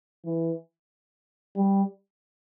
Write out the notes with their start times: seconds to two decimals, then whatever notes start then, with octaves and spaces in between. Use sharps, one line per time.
0.25 E3
1.56 G3